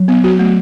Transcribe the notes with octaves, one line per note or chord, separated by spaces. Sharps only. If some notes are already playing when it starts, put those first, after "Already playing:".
Already playing: F#3
B3
F#4
A3